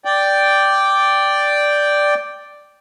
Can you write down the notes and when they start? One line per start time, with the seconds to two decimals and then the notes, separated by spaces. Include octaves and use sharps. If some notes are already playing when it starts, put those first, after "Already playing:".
0.05 D5 G5